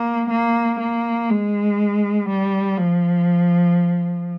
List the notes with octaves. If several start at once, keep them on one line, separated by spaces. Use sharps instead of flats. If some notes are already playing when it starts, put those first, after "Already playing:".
Already playing: A#3
A#3
A#3
G#3
G3
F3